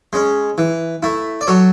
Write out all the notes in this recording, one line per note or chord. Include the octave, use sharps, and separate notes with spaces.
G#3 C#4
E3
A3 E4
D5
F#3 A4 C#5